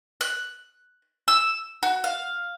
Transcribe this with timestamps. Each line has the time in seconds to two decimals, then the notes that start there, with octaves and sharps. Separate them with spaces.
0.21 F#6
1.28 E6
1.83 F#4
2.04 F5